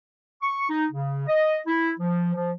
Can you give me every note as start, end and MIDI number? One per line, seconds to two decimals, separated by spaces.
0.41 0.65 85
0.69 0.86 63
0.91 1.24 49
1.27 1.57 75
1.67 1.91 64
2.00 2.31 53
2.35 2.52 53